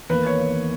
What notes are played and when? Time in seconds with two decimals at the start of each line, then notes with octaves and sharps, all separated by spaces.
0.10 E2 D#3 A#3 B4
0.26 C#5